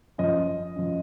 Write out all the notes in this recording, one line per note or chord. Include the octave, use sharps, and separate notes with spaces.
F#2 F3 D#5
F#2 F3